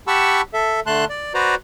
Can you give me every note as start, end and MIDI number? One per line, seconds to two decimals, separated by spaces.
0.08 0.41 67
0.08 0.41 78
0.08 0.41 81
0.08 0.41 83
0.08 0.41 85
0.08 0.41 88
0.54 0.80 69
0.54 0.80 76
0.86 1.05 50
0.86 1.05 57
0.86 1.05 81
0.86 1.05 84
0.86 1.05 90
1.09 1.34 74
1.34 1.55 66
1.34 1.55 71
1.34 1.55 72
1.34 1.55 74
1.34 1.55 82